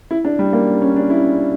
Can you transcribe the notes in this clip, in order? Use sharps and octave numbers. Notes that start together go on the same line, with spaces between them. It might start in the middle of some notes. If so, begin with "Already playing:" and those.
E4
D4
G3
A#3
C#4
D4
E4